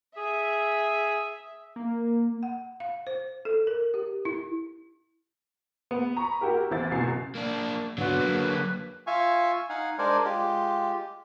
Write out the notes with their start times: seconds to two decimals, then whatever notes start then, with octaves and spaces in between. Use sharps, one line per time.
0.17 G#4 E5
1.76 A#3
2.43 F#5
2.80 F5
3.07 C5
3.45 A4
3.67 A#4
3.94 G4
4.25 E4
5.91 B3
6.17 A#5 B5 C#6
6.41 E4 F#4 G4 A#4
6.71 A1 E2 E4 C5 A6
6.91 C#2 F#2 B2 G#5 C7
7.35 A#3 D4
7.98 D3 F#3 B3 F#4 B4
8.20 F#3 A#3
9.07 F4 E5 F5 G#5 C#6
9.69 D#4 F5 F#5 G#5
9.99 G#3 D4 A#4 C5 D5 G#5
10.25 G#3 F4 G4